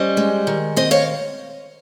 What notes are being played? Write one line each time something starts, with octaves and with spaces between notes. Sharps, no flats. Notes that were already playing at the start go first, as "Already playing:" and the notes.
Already playing: G3 C#4 C5 D#5
G#3
D#3
C4 C5 D#5
C#5 F5